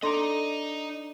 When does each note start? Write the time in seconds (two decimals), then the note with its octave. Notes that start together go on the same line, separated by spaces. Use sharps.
0.03 D4 D#4 A4 D#5 A#5 C6 D6